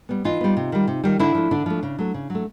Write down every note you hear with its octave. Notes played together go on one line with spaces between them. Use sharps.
G3 B3
E3 D#4 F4
G3 B3
C3
D#3 G3
C3
D#3 G3
D3 D4 E4
F3 A3
D3 D4
F3 A3
C#3
F#3 A3
C#3
F#3
A3